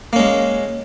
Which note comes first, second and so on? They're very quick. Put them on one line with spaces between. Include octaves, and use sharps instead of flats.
A#3 C#4 G#3